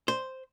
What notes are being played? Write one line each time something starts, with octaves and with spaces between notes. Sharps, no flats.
C5